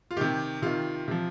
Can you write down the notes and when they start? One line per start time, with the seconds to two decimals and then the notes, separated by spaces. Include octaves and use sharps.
0.11 F4
0.17 C3 D#3 G4
0.62 C3 D#3 F4
1.08 C3 F3